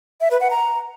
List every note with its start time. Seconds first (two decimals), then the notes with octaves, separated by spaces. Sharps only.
0.21 E5
0.31 B4
0.41 F#5
0.50 A#5